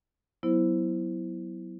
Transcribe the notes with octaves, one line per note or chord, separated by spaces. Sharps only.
F#3 B3 E4 C5